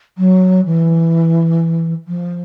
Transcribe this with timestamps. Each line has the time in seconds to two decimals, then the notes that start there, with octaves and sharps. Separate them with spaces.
0.18 F#3
0.65 E3
2.08 F3